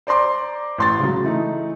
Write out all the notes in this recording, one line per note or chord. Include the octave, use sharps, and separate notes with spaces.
C5 D5 A#5 C6 D6
A1 C6 A6
C#3 F#3
E3 A3 D#4